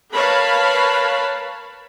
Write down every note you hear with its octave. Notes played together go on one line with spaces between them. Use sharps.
A#4 B4 C#5 F5 A5 B5